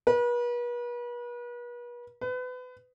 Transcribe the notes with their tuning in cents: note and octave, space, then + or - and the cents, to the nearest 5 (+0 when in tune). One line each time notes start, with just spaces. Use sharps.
B4 -40
B4 +30